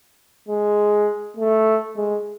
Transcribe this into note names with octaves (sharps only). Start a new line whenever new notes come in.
G#3
A3
G#3